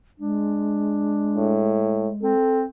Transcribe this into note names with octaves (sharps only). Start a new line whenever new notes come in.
G#3 D4
A2
C4 A4